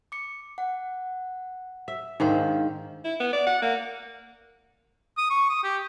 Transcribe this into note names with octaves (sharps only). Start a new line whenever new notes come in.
D6 C#7
F#5
E5
G#2 D#3 D4 C5 F5
E4
B3
D5
F#5
A#3
D#6
C#6
D#6
G4